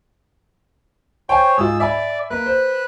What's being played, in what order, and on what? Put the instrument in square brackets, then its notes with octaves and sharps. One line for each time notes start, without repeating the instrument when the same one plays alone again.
[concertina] C5 C#5 [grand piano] G5 G#5
[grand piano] G#2 F4 [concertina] G#4 E6
[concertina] D5 [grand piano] E5 G#5 B5
[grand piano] A#3 [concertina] B4 F#6
[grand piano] C5